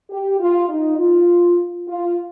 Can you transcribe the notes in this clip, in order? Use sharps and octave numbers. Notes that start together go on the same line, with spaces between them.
G4
F4
D#4
F4
F4